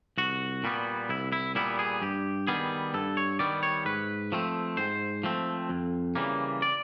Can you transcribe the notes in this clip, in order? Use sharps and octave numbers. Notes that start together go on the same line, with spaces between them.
C2 F#4
A#2 G3 B3
C2 E4
E4
A#2 G3 B3 E4
G#4
G2 G4
D#3 G3 B3 G#4
G2 A4
C#5
D#3 G3 B3 D5
C#5
G#2 B4
F3 A3 C4
G#2 C5
F3 A3 C4
F2
C#3 E3 G3 A#3
D5